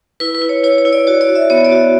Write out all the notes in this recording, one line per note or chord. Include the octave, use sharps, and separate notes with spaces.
E4 B4
B4
E4
C#5
E4 C#5
C#5
E4
D5
F#4 C#5
D5
F#4
E5
B3 C#5
D5
F#4